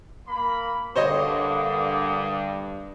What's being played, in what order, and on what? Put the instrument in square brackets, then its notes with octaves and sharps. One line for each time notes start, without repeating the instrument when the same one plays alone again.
[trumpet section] A#3 B5
[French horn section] G2 [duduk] D3 [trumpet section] A#3 D6 D#6 [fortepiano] C5 C#5 D#5